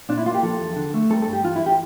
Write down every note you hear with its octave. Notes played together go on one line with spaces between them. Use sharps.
A#2 D4
E4
A#3 F4
G4
F3 A4
E2
D3
A3
G3 A4
A#4
A4
G2
G4
E3 F4
E4
G4